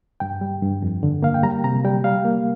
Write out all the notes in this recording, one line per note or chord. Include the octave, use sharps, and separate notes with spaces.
G2 G5
G3
G2
F2
D3
A#3 F5
G5
G3 A#5
C3 A#5
G3 G5
G3 F5
A#3